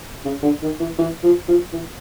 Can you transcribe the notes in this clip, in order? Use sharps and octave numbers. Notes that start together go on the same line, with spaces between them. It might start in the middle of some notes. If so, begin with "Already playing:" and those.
C#3
D3
D#3
E3
E3
F3
F3
E3